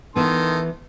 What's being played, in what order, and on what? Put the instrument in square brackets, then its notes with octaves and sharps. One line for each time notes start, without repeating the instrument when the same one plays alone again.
[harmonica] D#3 A4 C6 [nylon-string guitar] E3 B3